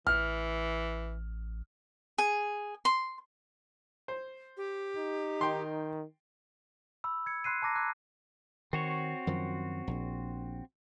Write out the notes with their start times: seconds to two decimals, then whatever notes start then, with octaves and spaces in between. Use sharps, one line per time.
0.07 A1 E3 F6
2.18 G#4
2.85 C6
4.08 C5
4.57 G4
4.97 D#4
5.41 D#3 G5 C6
7.04 B5 E6
7.26 G#6 C#7
7.44 B5 C6 F#6 C7 D#7
7.62 A5 A#5 D6 A#6
7.75 C6 D6 E6 F#6 G#6
8.73 D#3 C4 F#4 C#5
9.27 F#2 D#3 F3
9.87 A#1